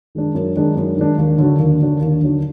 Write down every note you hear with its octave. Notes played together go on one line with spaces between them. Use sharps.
D#3 G#3 D4
F#2
D#3 G#3 D4
F#2
D#3 G#3 D4
D#2
D3 F#3 D4 F#4
D#2
D3 F#3 D4 F#4
D#2
D3 F#3 D4 F#4